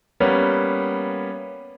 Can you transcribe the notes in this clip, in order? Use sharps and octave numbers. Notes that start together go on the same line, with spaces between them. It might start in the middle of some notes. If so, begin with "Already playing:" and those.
G3 A#3 B3 C#4